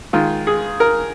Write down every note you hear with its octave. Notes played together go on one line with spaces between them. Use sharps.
D#3 G#3 F4
G#4
A#4